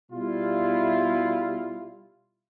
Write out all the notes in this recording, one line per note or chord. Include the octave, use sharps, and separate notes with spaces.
B2 G3 E4 F4